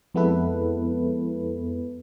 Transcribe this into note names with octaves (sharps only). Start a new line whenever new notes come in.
F2 G#3 B3 E4 A4 B4